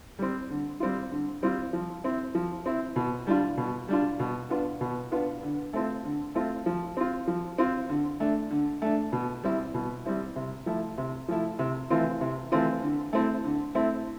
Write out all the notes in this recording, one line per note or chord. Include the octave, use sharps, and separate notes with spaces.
G3 C4
D3
G3 C4 F4
D3
G3 C4 F4
F3
C4 E4
F3
C4 E4
B2
G3 D4 F4
B2
G3 D4 F4
B2
B3 D4 F4
B2
B3 D4 F4
D3
A3 C4 F4
D3
A3 C4 F4
F3
C4 F4
F3
C4 F4
D3
A3 D4
D3
A3 D4
B2
G3 C4 E4
B2
G3 C4 E4
C3
F3 A3 E4
C3
F3 A3 E4
C3
E3 A3 C4 F4
C3
E3 A3 C4 F4
D3
A3 C4 E4
D3
A3 C4 E4